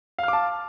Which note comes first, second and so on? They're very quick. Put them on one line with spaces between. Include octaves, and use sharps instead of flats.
F5 F6 D6 A5